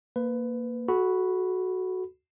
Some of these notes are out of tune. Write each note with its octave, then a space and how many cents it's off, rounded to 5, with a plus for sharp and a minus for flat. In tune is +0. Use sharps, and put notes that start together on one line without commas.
A#3 +0 B4 +15
F#4 +0 A4 -35 B5 +0